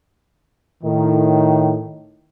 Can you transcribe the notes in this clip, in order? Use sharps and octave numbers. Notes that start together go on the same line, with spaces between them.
A2 D#3